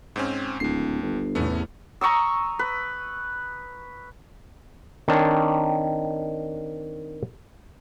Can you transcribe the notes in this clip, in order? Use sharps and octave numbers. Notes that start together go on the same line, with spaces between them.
G#2 C4 C#4
D1 D#2 C7
G1
E2 A2 C3 A3 B3 C#4
A#5 C#6 D#6 E6
B4
D#3 C4 D4 C#5